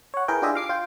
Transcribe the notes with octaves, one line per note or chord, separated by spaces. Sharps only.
C#5 F#5
E4 G#4 A#4 B4 G5
D4 F4 G4 G#4 D#5 E5
F5 D6 C7
F4 G5